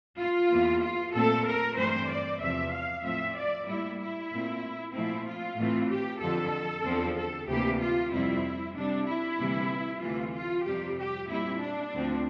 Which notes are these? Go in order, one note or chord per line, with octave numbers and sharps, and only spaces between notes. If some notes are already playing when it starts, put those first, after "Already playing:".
F4
E2 E3 A#3
F4
A#2 A3 C4 A4
A#4
G2 E3 A3 C4 C5
D5
E2 C3 F3 C4 E5
F5
A2 F3 C4 E5
D5
A2 G3 A#3 E4
E4
A#2 A3 C4
A#2 F3 A3 C4 E4
F4
A2 E3 A3 C4
G4
F2 D3 F3 A4
E2 D3 F3 C4
A4
D2 C3 E3 A#3 G4
F4
F2 C3 G3 C4 E4
C3 G3 C4 D4
E4
D2 C3 E3 G3 A#3
D2 C3 E3 A3 F4
F4
F2 C3 G3 C4 G4
G4
A#2 G3 C4 E4
D4
D2 D3 F3 C4